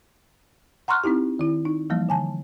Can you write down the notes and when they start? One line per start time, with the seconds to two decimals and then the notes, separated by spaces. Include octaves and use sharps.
0.88 F#5 A#5 C6 C#6 F6 F#6
1.04 C4 D#4 E4 G4
1.39 D#3 E4
1.65 D#4
1.90 E3 F3 G3 A#3
2.09 D3 G#5 A5